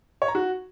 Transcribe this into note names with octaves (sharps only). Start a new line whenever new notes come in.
C#5
A#5
F#4